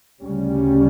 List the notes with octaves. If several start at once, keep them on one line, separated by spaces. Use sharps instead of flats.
D2 C#3 G3 C#4